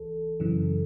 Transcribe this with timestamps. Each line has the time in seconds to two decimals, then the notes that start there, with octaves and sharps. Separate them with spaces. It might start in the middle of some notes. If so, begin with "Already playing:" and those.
Already playing: C#2 E3 A4
0.40 F#2 C#3 E3